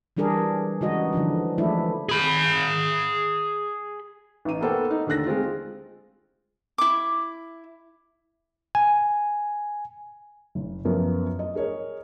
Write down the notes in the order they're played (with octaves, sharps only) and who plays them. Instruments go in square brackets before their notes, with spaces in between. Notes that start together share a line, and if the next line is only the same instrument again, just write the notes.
[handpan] E3 G3 D4 G#4 A#4
C#3 E3 G#3 D#4 F#4 D#5
D3 E3 F3 D4
E3 F3 G#3 A3 D4 E4
[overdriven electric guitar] G#4 B5
[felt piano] A1 D#4 D#7
A#3 B3 A4 C5 F#5 G5
D#4
D#2 D3 A4 F#6 A#6
G#3 C4 F4
[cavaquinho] E4 D6
[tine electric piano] G#5
[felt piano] F#1
F#2 F3 F#3 B3 A#4
D#5
G#4 A#4 C#5 D#5